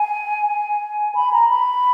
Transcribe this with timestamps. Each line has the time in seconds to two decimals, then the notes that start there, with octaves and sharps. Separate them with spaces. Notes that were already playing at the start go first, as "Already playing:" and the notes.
Already playing: G#5
0.49 G#5
1.15 B5
1.32 A#5
1.49 B5